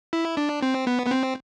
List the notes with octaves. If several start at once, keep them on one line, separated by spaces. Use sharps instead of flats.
E4
D4
C4
B3
B3
C4